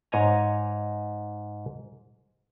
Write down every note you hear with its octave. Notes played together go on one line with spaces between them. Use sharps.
G#2 C#5 D#5 G#5 A#5